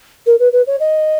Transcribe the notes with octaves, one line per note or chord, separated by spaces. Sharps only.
A#4
B4
B4
C#5
D#5